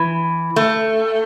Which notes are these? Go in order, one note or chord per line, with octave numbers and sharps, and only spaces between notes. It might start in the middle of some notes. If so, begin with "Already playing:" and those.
Already playing: E3
A3